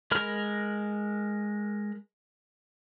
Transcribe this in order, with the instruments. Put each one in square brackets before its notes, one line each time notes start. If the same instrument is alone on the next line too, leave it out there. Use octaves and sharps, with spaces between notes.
[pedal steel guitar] G#3 A#4 B5 F6